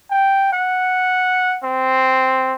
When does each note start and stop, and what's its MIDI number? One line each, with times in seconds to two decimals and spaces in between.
0.11 0.52 79
0.53 1.57 78
1.64 2.54 60